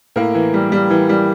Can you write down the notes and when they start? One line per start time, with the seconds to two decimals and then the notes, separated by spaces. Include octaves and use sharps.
0.16 A2 A#3 A#4
0.35 E3
0.54 G3
0.72 G3
0.90 E3
1.09 G3